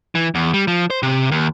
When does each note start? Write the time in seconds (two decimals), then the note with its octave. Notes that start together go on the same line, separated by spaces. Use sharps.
0.15 E3
0.35 E2
0.54 G3
0.68 F3
0.90 C5
1.03 C3
1.31 D#2